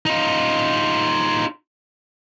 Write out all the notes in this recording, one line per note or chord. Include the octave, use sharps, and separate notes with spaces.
D#4 F4